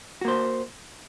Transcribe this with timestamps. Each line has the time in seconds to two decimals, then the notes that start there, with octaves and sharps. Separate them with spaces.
0.21 F#4
0.25 A#3
0.28 C5